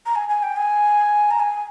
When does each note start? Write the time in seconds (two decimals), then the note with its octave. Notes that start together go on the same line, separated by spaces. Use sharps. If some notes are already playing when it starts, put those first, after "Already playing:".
0.06 A#5
0.16 G#5
0.29 G#5
0.43 G5
0.57 G#5
1.31 A#5
1.40 G#5